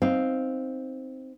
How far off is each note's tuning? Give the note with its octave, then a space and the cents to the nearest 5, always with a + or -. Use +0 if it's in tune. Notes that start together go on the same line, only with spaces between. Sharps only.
C4 +0 D#4 +0 F5 +0